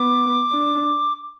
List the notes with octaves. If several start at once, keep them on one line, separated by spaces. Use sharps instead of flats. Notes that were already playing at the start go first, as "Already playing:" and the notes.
Already playing: B3 D6
D4